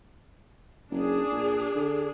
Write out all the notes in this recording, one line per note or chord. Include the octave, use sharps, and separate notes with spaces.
F#1 D4 G#4
A#2
D3